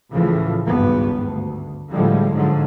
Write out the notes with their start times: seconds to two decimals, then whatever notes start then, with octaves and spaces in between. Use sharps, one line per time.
0.13 C#2 A2 C#3 E3 F3
0.66 G#1 C#2 G2 B3
1.26 D2
1.93 A2 D3 F3 G3 G#3
2.35 G#2 D3 F3 F#3